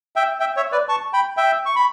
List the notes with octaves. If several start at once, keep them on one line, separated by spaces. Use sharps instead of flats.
E5 G5
E5 G5
C#5 E5
B4 D5
A5 C#6
G5 B5
E5 G5
C#6
B5